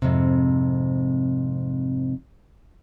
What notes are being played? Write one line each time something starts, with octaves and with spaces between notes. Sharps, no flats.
F2 G#2 C3